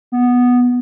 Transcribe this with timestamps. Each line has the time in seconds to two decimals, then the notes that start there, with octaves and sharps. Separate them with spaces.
0.12 B3